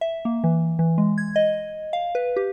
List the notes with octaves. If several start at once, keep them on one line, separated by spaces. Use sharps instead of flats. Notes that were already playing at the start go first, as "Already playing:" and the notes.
E5
A#3
E3
E3
G#3
G#6
D#5
F5
B4
G4